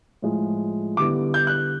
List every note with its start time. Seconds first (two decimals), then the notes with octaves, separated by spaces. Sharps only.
0.22 A2 F3 G#3
0.97 D3 G3 B3 E4 D6
1.34 G6
1.47 F#6